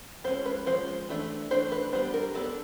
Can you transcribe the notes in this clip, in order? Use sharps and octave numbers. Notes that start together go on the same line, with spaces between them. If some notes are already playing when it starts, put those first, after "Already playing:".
F3 G#3 C#4 C5
B4
F3 G#3 C#4 C5
E3 A3 D4
E3 A3 D4 C5
B4
G3 B3 D4 C5
A#4
G3 B3 D4 A4